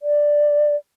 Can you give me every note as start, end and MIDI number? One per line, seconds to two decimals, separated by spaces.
0.02 0.76 74